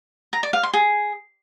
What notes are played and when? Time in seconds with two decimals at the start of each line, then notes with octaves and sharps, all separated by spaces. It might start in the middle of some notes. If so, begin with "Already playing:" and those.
0.33 A#5
0.43 D5
0.53 F5
0.63 C6
0.74 G#4